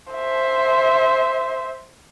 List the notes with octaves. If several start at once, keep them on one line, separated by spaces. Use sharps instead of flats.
C5 E5